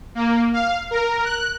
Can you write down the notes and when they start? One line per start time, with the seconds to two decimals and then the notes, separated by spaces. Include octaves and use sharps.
0.15 A#3
0.53 F5
0.91 A#4
1.24 F#6